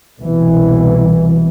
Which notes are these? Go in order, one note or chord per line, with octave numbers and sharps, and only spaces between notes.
C2 B2 E3